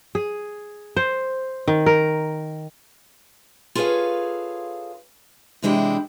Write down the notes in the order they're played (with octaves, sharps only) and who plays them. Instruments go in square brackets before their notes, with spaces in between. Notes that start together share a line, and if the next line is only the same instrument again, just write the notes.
[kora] G#4
C5
D#3
A#4
[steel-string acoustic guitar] F4 G#4 A4 B4 C#5 F5
C3 E3 G#3 D4 E4 G4